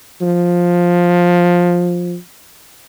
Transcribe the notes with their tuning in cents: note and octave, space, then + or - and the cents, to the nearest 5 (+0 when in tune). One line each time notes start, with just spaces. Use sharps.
F3 +10